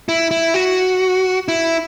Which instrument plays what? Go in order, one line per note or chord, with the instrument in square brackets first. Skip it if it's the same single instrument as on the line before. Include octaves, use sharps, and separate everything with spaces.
[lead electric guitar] E4
E4
F#4
E4